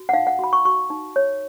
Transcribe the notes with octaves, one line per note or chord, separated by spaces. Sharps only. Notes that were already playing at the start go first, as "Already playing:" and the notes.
Already playing: F#4
F#5
D#4 F5
F#5
F#4 B5
C#6
F#4 C#6
D#4
C#5